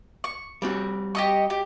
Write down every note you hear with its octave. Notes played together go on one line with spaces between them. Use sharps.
C#6
G3 C4 F#4
G4 D#5 C#6
G4